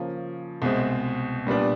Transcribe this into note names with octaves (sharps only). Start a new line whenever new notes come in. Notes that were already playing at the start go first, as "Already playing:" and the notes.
Already playing: C#3 F3 A#3 C#4
C2 B2 G#3 C4
A#2 G3 B3 D4